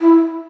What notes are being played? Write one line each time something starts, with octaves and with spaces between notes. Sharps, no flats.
E4